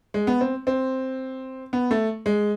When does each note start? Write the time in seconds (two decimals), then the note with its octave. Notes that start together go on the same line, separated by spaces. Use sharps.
0.14 G#3
0.27 B3
0.41 C4
0.67 C4
1.73 B3
1.91 A3
2.26 G#3